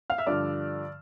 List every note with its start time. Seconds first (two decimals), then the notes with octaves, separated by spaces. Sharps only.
0.10 F5 F6
0.18 E5 E6
0.27 G2 D3 F3 D5 D6